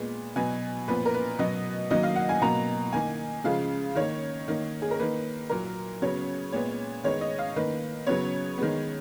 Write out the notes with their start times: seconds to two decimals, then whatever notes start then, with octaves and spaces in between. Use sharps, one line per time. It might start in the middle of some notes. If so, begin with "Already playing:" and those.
Already playing: A#2 G#3 B3
0.36 B2 F#3 B3 G#5
0.88 A#2 F3 B3 B4
1.06 A#4
1.14 B4
1.38 B2 F#3 B3 D#5
1.91 D#3 F#3 A#3 D#5
2.03 F5
2.16 F#5
2.29 G#5
2.42 B2 F#3 A#3 A#5
2.93 D#3 A#3 G#5
3.44 C#3 F3 G#3 F5
3.95 D#3 A#3 C#5
4.48 D#3 A#3
4.82 G#4
4.91 A#4
4.99 D#3 A#3 B4
5.50 A#2 F#3 A#3 A#4
6.02 C#3 F#3 B3 C#5
6.52 A#2 G#3 B3 C#5
7.04 D#3 G#3 B3 C#5
7.21 D#5
7.39 F5
7.56 D#3 A#3 B4
8.07 C#3 F#3 B3 C#5
8.58 D#3 G#3 B3